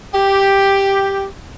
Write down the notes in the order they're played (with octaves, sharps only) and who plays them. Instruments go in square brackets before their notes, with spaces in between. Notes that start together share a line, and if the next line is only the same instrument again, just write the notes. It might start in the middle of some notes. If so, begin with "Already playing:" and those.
[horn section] G4